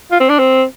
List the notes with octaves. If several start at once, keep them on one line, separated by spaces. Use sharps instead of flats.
F4
C4
D4
C4